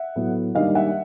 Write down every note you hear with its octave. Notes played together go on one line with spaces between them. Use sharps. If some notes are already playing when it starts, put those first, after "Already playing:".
Already playing: E5 F#5
A2 F#3 B3
G#2 D#3 G3 A#3 D4 D#5 F5
E5 F#5